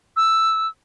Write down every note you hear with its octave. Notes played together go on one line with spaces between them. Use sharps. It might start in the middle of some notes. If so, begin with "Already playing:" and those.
E6